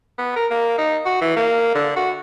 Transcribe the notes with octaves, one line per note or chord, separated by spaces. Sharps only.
B3
A#4
A#3
D#4
F#4
E3
A#3
D3
F#4